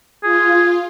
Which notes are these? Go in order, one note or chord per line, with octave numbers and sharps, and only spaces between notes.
F4 G#4